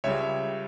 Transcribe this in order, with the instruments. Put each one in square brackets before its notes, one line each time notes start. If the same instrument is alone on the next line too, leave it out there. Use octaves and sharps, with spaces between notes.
[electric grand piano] C#2 C#3 G3 C#5 E5